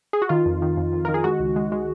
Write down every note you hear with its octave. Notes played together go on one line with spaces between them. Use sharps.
G#4
F#4
D#3 F4
F2
D#3
F2
F2
D#3 A#4
G#4
G#3 F#4
C#2
G#3
G#3